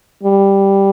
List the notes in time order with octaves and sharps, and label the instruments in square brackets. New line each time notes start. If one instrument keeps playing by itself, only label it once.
[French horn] G3